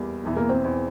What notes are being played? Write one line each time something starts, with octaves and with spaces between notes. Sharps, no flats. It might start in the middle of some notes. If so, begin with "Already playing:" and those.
Already playing: E2 G3 A#3
E1 E2 E3
A#3
C4
E2 E3